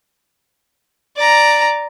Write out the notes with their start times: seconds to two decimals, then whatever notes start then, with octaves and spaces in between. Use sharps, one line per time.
1.17 D5 A#5